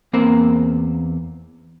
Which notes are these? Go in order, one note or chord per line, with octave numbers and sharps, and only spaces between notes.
E2 A#3 C4 A#4 C5